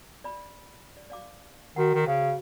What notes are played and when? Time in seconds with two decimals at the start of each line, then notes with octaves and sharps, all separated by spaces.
0.24 D5 B5
0.97 D5
1.10 D5 F5 D6
1.76 D#3 F#4 F#5
1.95 D#3
2.07 C#3 C5